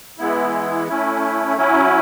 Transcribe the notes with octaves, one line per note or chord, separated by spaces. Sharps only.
E3 G#3 B3 E4
A3 C#4 E4
F#3 C#4 E4